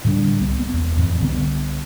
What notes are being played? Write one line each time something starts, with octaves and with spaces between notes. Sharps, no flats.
A2 D3 G3 D4
C2 B3
B3
E1 E2
F2 A2 E3
C2 D3 B3